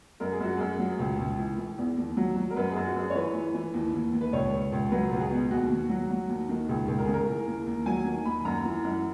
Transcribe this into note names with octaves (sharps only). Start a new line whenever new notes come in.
F#2 A#4
G#4
F#2 F#4
F#2 G#4
F#3
C#2
C#2
E3
E3
E2
D#2
F#3
F#3
A#4
F#2 B4
F#2 G#4
F#4
F#2 G#4
C#5
E3 B4
E3
E3
D#2
D#2
D#2
B4
C#2 C#5
C#2
C#2
F#3 B4
C#2
F#4
G#4
B2
D#2 F#4
D#2
F#3
F#3
D#2
D#3
C#2 G#4
C#2
A#4
C#3 G#4
A#4
E3
D#2
D#2
F#3 G#5
D#3
D#2 B5
F#2 A#5
E3
F#2